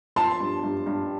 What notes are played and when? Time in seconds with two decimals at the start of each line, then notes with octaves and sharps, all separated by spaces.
0.16 F3 A5 C6
0.40 G2
0.63 G2
0.86 G2